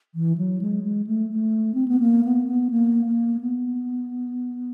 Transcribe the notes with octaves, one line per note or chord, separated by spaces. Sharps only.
E3
F#3
G#3
G#3
A3
A3
C4
B3
A#3
B3
B3
A#3
A#3
B3